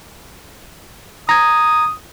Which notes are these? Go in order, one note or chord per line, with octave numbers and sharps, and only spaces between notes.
A#5 D#6 G#6